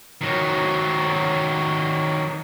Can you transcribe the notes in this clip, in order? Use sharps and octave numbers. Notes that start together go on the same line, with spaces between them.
D#3 F#3